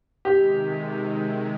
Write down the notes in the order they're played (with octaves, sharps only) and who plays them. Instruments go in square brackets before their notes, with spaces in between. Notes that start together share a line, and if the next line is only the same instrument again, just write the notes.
[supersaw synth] C3 D#3 G#3 [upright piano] G4